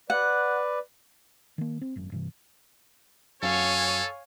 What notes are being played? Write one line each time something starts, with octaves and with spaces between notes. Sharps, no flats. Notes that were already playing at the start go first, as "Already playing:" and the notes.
B4 D5 F#5
D#3 A#3
C4
G#1 F#2
G2 C3 E3
F#2 F#4 A4 C#5 F5 G#5